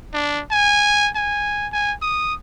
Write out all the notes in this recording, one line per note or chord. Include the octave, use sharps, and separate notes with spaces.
D4
G#5
G#5
G#5
D#6